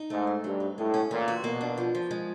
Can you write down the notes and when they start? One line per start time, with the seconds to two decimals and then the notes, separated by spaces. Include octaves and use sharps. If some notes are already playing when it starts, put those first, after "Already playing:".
Already playing: D#4
0.10 G#2 A3
0.27 C4
0.44 G2 F#3
0.60 D#4
0.78 A2 G#3
0.94 C#4
1.11 A#2 E3
1.28 F#4
1.44 B2 A#3
1.61 D4
1.78 F3
1.95 F3
2.11 G#3